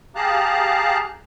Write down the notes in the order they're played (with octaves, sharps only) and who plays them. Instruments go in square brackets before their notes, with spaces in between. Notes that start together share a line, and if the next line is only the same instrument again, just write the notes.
[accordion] G4 G#4 F5 A5 A#5 F#6